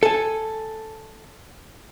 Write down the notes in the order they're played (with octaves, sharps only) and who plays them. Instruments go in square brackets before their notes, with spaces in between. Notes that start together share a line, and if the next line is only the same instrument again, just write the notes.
[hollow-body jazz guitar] A4 G#5